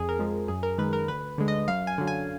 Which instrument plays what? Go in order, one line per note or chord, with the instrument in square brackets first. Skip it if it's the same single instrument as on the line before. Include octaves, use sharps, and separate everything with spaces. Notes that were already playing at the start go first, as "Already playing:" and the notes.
Already playing: [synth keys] F2 G#4
A#4
F3 G#3
F#2 G#4
A#4
D#3 G#3 B4
A#4
D2 B4
D3 G#3
D#5
F#2 F5
G#5
D3 F#3
G#5